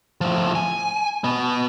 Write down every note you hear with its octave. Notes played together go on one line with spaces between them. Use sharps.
A2 F3
G#5
B2 B3